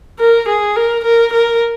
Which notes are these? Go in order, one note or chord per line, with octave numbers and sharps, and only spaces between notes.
A#4
G#4
A#4
A#4
A#4